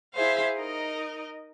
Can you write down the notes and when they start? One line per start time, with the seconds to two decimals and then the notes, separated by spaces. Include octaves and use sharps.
0.14 E4 G#4 C5 E5 F5
0.56 D#4 A#4 D#5